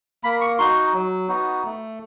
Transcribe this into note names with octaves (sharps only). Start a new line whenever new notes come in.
A#3 B5
C#6
D#4 F#4 C6
F#3
B3 D#4 F#4
A3